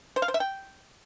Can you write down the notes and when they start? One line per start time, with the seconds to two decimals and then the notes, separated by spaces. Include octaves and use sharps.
0.16 C5
0.22 F5
0.28 C5
0.34 E5
0.40 G5